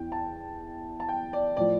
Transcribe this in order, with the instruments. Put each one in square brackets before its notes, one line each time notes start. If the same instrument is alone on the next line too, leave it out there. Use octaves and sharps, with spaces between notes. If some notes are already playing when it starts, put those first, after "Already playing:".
Already playing: [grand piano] E2 E3 G5
A5
A5
G5
D5
A2 F3 D5